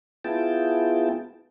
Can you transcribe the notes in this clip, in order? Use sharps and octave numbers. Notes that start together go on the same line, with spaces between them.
B3 E4 F4 G#4 G5 A5